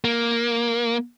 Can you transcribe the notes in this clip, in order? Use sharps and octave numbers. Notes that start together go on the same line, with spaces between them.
A#3